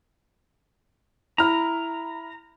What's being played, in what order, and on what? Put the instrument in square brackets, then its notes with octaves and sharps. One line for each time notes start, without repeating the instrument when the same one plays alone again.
[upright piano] E4 B5 F6 [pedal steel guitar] A#5